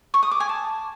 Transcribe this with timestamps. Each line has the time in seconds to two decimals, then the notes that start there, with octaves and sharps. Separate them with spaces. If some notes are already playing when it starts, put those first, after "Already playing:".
0.14 C#6
0.23 D#6
0.31 D6
0.40 G#5
0.49 A5